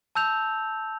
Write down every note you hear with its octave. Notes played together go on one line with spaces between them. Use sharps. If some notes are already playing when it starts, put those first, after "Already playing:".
A5 E6 G6 F7